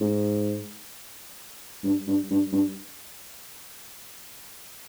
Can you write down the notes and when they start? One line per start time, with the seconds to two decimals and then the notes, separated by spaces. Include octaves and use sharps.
0.01 G#2
1.84 G2
2.07 G2
2.31 G2
2.53 G2